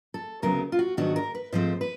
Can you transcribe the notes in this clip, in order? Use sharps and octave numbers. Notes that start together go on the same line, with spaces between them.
A4
D2 C#3 F#3 B3 A#4
F4
F#4
G#2 D#3 F#3 B3 D4 F#4
A#4
B4
G#2 F3 A3 C4 C5
B4